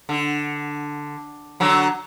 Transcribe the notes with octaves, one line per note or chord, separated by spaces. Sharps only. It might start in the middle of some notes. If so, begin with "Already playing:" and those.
D3
D3 F#3